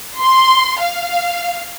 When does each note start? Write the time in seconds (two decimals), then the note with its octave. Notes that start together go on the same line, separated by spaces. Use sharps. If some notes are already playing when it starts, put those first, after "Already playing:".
0.18 C6
0.81 F5